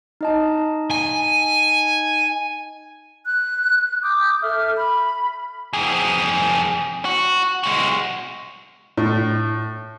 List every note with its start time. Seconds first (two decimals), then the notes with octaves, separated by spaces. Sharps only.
0.21 D#4 D#5 A5
0.91 G#5
3.25 F#6
4.03 D6 D#6 G6
4.42 A4 E5 F6
4.75 B5
5.73 F2 G#4
7.05 F#4
7.63 G#3 F#4
8.97 A2